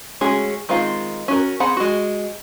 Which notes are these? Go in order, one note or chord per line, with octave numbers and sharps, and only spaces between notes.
G#3 A3 C#4 F#4 G#4
D#3 G#3 C4 F4
C#4 F#4 A#4
C4 G#4 F#5 B5
G#3 F#4